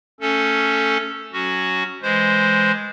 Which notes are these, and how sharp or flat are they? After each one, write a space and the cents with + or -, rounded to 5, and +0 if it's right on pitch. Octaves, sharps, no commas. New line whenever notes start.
A3 +20 C#4 +0 A4 +0
F#3 +0 C#4 +0 F#4 +0
E3 +0 G#3 +0 C5 +0